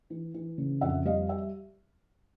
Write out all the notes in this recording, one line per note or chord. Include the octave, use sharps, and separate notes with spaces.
E3
E3
C#3
F2 E5 F#5
G3 D#5 F5
E5